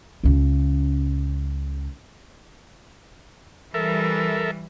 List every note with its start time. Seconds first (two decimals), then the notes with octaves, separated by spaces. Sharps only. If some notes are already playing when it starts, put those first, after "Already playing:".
0.23 C#2 C#3
3.74 E3 G3 A4 A#4 E5